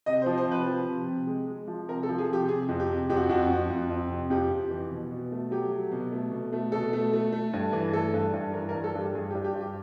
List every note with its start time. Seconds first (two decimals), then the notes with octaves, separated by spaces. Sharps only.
0.06 C3 D#5
0.22 C5
0.26 F3
0.37 C5
0.46 C3
0.51 B4
0.67 F3
0.87 C3
1.08 C3
1.27 G#3
1.48 G#3
1.67 F3
1.89 C3 A#4
2.03 A4
2.09 F3
2.18 G#4
2.29 C3 G4
2.48 C3 G#4
2.69 F2
2.80 G4
2.90 C3
3.09 F2 G4
3.17 F#4
3.29 F2 F#4
3.50 F2
3.70 F2
3.89 F2
4.10 C3
4.30 F2 G4
4.51 F2
4.71 E3
4.91 B2
5.11 B2
5.32 A3
5.51 F#3 G4
5.71 F#3
5.92 B2
6.12 A3
6.32 B2
6.53 A3
6.72 B2 A4
6.93 A3
7.13 A3
7.32 A3
7.53 G2
7.73 E3
7.93 A3 A4
8.13 G2
8.33 G2
8.54 E3 A#4
8.69 A#4
8.75 G2
8.84 A4
8.95 G2 G4
9.15 G2 G#4
9.30 G4
9.35 G2
9.44 G4
9.55 G2
9.61 G4